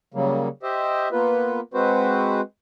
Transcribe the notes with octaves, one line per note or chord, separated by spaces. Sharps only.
C#3 F#3 G3 A#3
G4 C5 D#5 E5
A#3 B3 F4 B4
G#3 C4 F#4 B4 C5